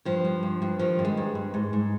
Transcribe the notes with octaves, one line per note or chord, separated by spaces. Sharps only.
G2 F3
G2
G2
G2
D#3 F3
G2
G#3
G2
G2
G#2
G#2